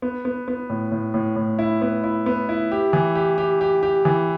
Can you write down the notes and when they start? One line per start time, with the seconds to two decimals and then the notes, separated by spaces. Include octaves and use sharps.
0.02 B3
0.25 B3
0.48 B3
0.70 A2
0.92 A2
1.14 A2
1.36 A2
1.59 E4
1.81 B3
2.04 E4
2.26 B3
2.49 E4
2.72 G4
2.93 E3
3.15 G4
3.38 G4
3.61 G4
3.83 G4
4.05 E3